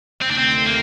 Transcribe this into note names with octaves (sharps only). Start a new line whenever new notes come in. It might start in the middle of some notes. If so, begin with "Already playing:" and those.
D2 C3 D#3 A3 C4
D4
C4
A#3